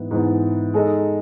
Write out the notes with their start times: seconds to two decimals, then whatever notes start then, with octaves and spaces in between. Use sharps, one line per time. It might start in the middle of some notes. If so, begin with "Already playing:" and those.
Already playing: G#2 E3 B3
0.11 G#2 E3 B3
0.74 G#3 D#4 A4 D#5